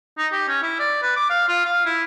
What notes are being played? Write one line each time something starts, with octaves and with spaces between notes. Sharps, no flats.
D#4
G4
C#4
E4
D5
B4
D6
F5
F4
F5
E4